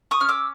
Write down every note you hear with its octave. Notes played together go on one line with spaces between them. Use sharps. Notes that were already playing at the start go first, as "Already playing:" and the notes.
C#6 D#6
C#4 F6
D6 E6